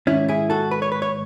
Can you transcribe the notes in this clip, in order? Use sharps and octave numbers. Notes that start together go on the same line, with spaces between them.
G#2 D#3 C#4 E4
E4 G#4
F#4 A4
B4
C#5
B4
C#5